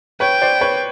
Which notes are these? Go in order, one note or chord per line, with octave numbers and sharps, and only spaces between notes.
B4 C#5 G5
C5 D5
B4 C#5